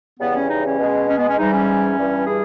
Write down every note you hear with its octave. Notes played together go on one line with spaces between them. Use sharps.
E2 C#3 E3 G3 B3
C#4
D#4
C#4
B2 G#3
C#4
B3
C#4
G#2 E3 G3 D#4
C#4
G2 E3 G3
G#4